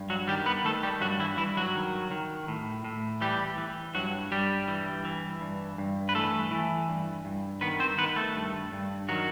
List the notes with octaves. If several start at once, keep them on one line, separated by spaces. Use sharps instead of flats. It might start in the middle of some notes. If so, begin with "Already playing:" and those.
Already playing: G2
F#3 F#4
D#3 G3 G4
B3 B4
D#3 A3 A4
G3 G4
G2 F#3 F#4
E3 E4
G2 E3 E4
F#3 F#4
D#3
D#3
A2
A2
E3 G3 G4
E3
G2 F#3 F#4
G2 G3 G4
E3
E3
G2
G2
B4
E3 A3 A4
E3
G2
G2
D#3 B3 B4
C4 C5
D#3 B3 B4
A3 A4
G2
G2
D#3 F#3 F#4